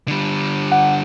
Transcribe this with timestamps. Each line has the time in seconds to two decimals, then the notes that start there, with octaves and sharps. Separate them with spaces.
0.08 D3 G3
0.72 F#5